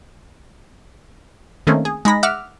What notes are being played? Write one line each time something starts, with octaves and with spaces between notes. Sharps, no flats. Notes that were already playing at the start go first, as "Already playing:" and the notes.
D#3 A3 A#3 C4 C#4
G#4
G#3 D#4 B5 A#6
E5 F#5 D6 F6